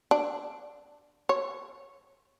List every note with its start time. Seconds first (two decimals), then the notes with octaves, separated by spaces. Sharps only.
0.11 D4
1.29 C#5